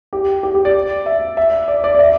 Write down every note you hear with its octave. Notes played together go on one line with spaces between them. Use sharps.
G4
G4
G4
D5
E5
E5
D5
D5
D5
E5